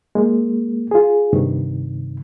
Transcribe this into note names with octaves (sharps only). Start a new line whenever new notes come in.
G#3 A#3
F4 G#4
G2 C3 D#3